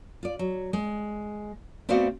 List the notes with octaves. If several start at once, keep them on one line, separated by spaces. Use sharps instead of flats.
F4 D5
F#3
G#3
A3 B3 C4 F#4 D5 F5